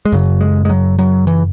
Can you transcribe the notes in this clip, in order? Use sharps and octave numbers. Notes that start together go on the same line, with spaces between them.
G#3
F#2 C#3 F#3
G#3
G#3
F#3
F#3
E3